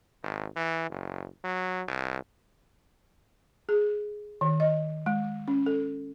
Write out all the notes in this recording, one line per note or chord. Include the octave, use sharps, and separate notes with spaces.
G#1
E3
F#1
F#3
C2
G#4
D#3
D#5
G#3
C#4
A4